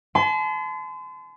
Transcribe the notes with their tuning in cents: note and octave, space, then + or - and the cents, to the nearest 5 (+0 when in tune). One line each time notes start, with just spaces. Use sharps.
A5 -40 C6 -40